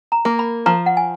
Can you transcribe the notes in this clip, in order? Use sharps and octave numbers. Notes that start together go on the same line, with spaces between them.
A#5
A#3
B5
F3 A#5
F#5
G#5